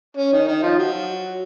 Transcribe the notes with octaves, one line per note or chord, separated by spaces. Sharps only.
C#4
D#3
D#3
F3
F#3